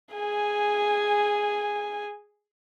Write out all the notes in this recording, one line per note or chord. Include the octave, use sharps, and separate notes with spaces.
G#4 G#5